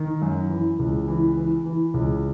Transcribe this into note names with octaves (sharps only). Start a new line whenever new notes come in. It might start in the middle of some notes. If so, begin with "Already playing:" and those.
Already playing: D#3
F#2
E3
C#2
E3
E3
E3
C#2